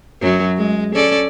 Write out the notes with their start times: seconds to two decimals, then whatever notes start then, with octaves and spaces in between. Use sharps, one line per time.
0.21 F#2 F#3
0.57 G#3
0.94 C#4 A4 D5